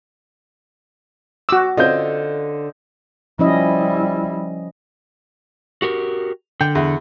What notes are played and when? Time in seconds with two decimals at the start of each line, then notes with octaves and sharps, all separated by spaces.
1.49 F#4 D6 E6
1.77 D3 C4 C#4 F4 D#5 G6
3.39 F3 G3 C#4 E4 D#5
5.82 F#4 G4 A#4
6.61 D3 G5
6.75 E2